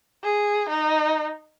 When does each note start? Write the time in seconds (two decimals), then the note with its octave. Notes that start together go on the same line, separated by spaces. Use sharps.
0.24 G#4
0.69 D#4